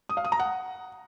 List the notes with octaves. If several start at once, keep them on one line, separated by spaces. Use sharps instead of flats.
D#6
F5
D#6
A#5
F#5